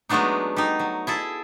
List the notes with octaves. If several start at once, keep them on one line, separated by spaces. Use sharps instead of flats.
F#3 G#3 A3 B3 D4 D#4
G3 D#4
F#3
E4 G#4 A4